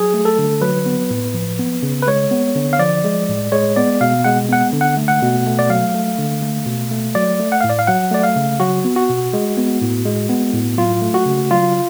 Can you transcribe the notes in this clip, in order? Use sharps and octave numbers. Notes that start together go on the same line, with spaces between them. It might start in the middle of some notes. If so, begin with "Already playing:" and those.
Already playing: F#3 G#4
A3
A4
D3
F#3 B4
B3
A2
F3
B3
C#3
B4
G#3 C#5
B3
D3
F5
F3 D5
G#3
A2
G#3 C#5
B3 D5
B2 F5
G#3 F#5
B3 F#5
D3
F#5
A3
F#5
B2
A3
D5
F#3 F5
A3
D3
A3
B2
A3
F#3 D5
A3
F#5
A2 F5
D5
F5
F#3 F#5
A3 D5
F5
C#3
F#3 F#4
B3
F#4
B2
G#3
B3
A2
G#3
B3
A2
F#3 F4
A3
F#4
C#3
F#3 F4